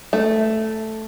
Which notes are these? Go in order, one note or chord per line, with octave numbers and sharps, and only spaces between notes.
A3